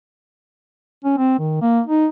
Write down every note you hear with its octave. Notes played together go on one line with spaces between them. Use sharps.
C#4
C4
D#3
A#3
D#4